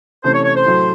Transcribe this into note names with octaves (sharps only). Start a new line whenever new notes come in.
C3 E3 A3 C#4 C5
C#5
C#5
C5
A2 F#3 A3